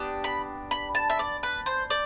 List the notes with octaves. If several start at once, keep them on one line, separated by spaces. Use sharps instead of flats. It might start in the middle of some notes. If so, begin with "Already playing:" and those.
Already playing: B3 D4 G4
B5
B5
A5
E5
D5
B4
C5
D5